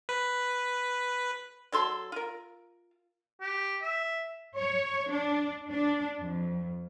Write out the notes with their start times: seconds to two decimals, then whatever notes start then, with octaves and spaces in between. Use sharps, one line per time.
0.09 B4
1.72 F#3 A4 C6
2.12 F4 A#4
3.41 G4
3.82 E5
4.56 C#5
5.11 D4
5.69 D4
6.21 F2